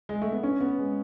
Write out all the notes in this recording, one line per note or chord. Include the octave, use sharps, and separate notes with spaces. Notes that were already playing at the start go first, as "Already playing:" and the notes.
G#3
A3
B3
C#4
B3
G#3